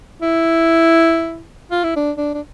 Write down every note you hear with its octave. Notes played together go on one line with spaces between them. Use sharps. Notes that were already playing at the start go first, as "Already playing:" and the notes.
E4
F4
E4
D4
D4
D4